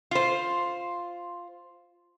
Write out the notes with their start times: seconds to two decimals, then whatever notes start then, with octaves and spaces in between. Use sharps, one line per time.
0.11 F4 C5